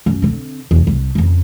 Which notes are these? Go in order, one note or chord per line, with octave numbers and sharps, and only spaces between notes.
F#2
D3 C4
E2 C3
C2
F2 C#3